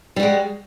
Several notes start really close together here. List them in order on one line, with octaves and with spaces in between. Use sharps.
G3 F#4 G#3